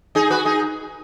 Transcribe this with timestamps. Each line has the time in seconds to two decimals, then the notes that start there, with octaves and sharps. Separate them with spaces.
0.15 D#4 G#4
0.30 F#4 B4
0.45 D#4 G#4